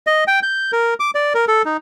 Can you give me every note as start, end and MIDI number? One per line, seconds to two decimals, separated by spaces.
0.07 0.24 75
0.28 0.40 79
0.43 0.71 91
0.72 0.94 70
1.00 1.11 86
1.15 1.33 74
1.34 1.45 70
1.48 1.62 69
1.65 1.77 63